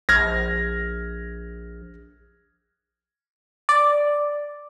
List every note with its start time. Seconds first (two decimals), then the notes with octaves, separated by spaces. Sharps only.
0.09 A#1 F6 G#6 A#6
3.69 D5